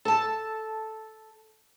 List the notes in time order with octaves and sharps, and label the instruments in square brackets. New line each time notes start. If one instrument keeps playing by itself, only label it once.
[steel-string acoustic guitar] A4 A5